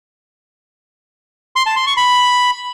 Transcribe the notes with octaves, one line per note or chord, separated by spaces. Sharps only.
C6
A5
C6
C#6
B5